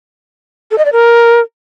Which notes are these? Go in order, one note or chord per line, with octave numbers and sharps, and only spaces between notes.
A4
D#5
D5
A#4